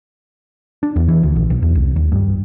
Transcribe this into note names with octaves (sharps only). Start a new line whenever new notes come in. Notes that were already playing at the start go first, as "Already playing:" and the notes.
D4
E2
E3
D2
A#1
B1
E2
C2
D#2
G2